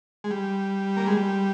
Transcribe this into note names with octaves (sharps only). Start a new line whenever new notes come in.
G#3
G3
A#3
G#3
G3